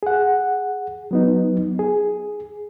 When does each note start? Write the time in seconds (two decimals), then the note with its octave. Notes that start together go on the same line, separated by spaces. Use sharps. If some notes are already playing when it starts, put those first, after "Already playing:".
0.03 G#4 F#5
1.11 F#3 B3 D#4
1.79 G#4